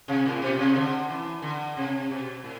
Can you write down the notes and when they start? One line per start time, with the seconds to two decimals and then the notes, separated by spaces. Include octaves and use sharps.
0.08 C3
0.26 A2
0.42 B2
0.59 C3
0.76 D3
1.09 E3
1.42 D3
1.77 C3
2.11 B2
2.44 A2